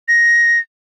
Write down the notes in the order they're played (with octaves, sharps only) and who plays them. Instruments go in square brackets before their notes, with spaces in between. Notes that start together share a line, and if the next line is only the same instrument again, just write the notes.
[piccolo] A#6